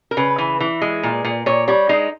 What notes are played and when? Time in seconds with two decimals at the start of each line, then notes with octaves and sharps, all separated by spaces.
0.11 A#4
0.17 C#3 B4
0.38 E3
0.60 E3
0.82 G#3
1.03 A#2
1.25 A#2
1.46 A#2 C#5
1.68 G3 C#5
1.89 G#3 D#4